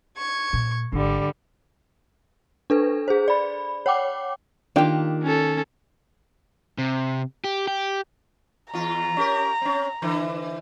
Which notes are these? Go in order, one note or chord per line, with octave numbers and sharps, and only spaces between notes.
C#6 G#6
A#2
G#1 D3 G3
D4 A4 B4
G#4 C5
D5 B5
C#5 F#5 G5 D6
D#3 A#3 D4 F4 G4
C#4 A4
C3
G4
G4
E2 F4 A#5
C#4 G4 A#4
C4 C#4
D3 E3 C5